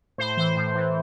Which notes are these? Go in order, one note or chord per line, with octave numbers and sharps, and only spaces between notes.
A2 C5
E3 C5
A2
E3